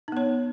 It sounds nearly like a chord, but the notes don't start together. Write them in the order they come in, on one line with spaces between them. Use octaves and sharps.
D#4 B3 C#5